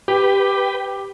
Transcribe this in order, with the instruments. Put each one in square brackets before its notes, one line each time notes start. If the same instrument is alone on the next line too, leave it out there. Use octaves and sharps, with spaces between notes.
[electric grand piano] G4 [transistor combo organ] B4 G5